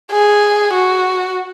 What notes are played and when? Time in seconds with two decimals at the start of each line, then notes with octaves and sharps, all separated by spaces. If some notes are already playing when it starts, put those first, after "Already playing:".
0.12 G#4
0.74 F#4